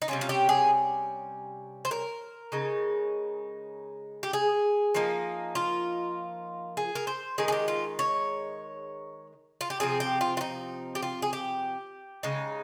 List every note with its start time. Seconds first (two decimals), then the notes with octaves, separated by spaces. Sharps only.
0.02 D#4
0.08 C3 G3 C#4 F4
0.21 F4
0.29 G4
0.49 G#4
1.85 C5
1.91 A#4
2.52 C#3 G#3 D#4
4.23 G4
4.33 G#4
4.95 F3 A#3 D#4
5.55 F4
6.77 G#4
6.95 A#4
7.07 C5
7.38 D#3 G#3 D#4 G#4
7.48 G#4
7.52 G4
7.68 F4
7.99 C#5
9.61 F4
9.70 G4
9.80 C3 F3 C4 G#4
10.00 G4
10.21 F4
10.37 F4
10.41 D#4
10.95 G4
11.02 F4
11.22 G#4
11.33 G4
12.23 C#3 G#3 D#4